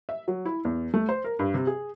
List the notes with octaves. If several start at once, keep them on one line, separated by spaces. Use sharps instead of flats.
E5
F#3
E4
E2
A3
C5
A#4
G2
C3
G#4